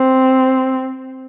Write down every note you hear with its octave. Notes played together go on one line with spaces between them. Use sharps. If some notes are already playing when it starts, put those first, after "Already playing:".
Already playing: C4